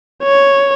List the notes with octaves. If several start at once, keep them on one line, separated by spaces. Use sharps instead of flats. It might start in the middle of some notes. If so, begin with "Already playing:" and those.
C#5